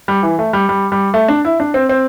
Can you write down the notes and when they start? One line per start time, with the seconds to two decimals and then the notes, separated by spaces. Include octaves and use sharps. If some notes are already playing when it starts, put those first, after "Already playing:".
0.08 G3
0.23 E3
0.39 A3
0.53 G3
0.69 G3
0.92 G3
1.14 A3
1.28 D4
1.45 E4
1.60 D4
1.74 C4
1.89 C4